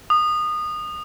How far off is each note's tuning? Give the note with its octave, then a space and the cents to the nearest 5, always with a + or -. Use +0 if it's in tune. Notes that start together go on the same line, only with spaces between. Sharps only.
D#6 -25